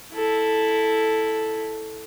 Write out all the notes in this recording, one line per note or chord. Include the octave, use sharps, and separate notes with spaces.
E4 A4